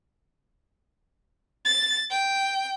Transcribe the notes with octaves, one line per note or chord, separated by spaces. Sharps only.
A6
G5